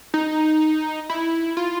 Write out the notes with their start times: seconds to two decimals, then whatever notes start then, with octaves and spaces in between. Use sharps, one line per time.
0.14 D#4
1.10 E4
1.57 F4